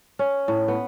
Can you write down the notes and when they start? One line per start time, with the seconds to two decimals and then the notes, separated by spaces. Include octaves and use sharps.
0.19 C#4
0.48 A2
0.68 B3